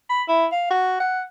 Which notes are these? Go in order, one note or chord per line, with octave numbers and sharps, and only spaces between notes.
B5
E4
F5
F#4
F#5